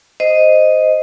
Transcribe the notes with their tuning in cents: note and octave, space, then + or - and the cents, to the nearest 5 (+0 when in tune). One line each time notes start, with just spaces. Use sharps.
C5 -10 D#5 +0